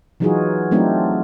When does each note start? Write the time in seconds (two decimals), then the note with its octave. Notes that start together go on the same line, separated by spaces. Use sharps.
0.20 E3 F#3 D#4 F4 F#4 G#4
0.71 F#3 A3 C4 D4 D#4 F4